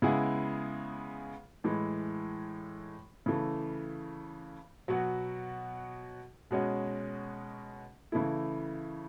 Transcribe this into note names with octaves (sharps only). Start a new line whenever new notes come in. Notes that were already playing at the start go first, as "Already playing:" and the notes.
C#3 G#3 B3 E4 G#4
A2 E3 G#3
C#3 E3 A3
B2 F#3 B3 F#4
B2 G#3 C#4 F#4
C#3 E3 A3 E4